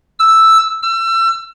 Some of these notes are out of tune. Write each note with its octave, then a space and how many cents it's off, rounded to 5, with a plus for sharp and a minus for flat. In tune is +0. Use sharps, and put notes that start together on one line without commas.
E6 +0
E6 +30